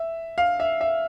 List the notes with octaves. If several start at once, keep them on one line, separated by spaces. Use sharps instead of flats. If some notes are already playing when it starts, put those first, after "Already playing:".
Already playing: E5
F5
E5
E5